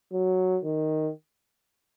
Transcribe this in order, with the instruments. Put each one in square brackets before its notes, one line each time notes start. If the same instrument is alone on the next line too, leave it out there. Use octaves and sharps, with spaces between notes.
[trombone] F#3
D#3